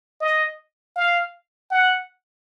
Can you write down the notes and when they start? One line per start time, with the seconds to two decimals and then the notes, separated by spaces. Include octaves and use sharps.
0.21 D#5
0.96 F5
1.71 F#5